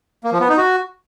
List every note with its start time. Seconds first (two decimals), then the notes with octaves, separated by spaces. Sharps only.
0.24 A#3
0.32 F3
0.41 B3
0.49 D#4
0.57 F#4